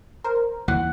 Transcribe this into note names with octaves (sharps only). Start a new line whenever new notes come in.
A#4 C5
D#2 E3 F#5